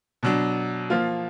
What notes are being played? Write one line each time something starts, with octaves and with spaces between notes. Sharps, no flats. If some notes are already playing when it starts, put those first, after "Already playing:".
B2 F#3 D4
F3 A#3 F4